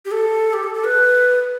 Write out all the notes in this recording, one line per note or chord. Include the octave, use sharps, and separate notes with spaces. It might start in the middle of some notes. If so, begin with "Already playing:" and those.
G4
A4
G4
A4
A4
B4